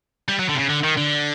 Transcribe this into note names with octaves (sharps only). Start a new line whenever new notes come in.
G3
F#3
D3
C3
C#3
D3
D#3
D3